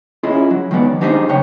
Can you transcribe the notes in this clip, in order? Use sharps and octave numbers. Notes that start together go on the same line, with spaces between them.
C#4 E4 F4 G#4 D#5
F#3
D#3 F#3 G#3 B3 D5
F#3 D4 D#4 G4 G#4 C5
C#3 D4 C#5 G5